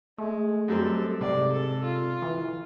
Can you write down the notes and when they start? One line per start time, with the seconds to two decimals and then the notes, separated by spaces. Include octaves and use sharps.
0.18 G#3 A3
0.68 F#2 G3 C4 A4
1.21 G#2 C3 D5
1.52 A4
1.83 F4
2.22 E3